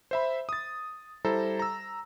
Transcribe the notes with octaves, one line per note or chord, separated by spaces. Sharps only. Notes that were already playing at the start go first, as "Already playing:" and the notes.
C5 E5 B5
D#6 A6
G3 E4 A4 C5 A#5
A#5 E6